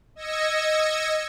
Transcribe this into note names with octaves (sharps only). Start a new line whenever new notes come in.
D#5 E6 G#6 A#6 C#7